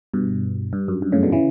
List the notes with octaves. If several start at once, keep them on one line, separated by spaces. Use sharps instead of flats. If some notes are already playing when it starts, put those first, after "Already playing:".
G2 B2
G2
F#2
G2
A2 C#3
B2 D3
C#3 E3